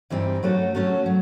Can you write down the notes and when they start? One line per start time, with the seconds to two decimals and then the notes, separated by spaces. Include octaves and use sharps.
0.10 G2 E3 G3 C4 D#4
0.43 F#3 A3 C#4 F#4 A4
0.75 F#3 A3 C#4 F#4 A4
1.06 F#3